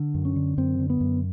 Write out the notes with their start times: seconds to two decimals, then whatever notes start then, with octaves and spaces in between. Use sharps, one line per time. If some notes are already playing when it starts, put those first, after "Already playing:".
Already playing: D3
0.14 F#2
0.25 C#4
0.36 D3
0.58 F#2 C4
0.79 D3
0.90 B3
1.01 F#2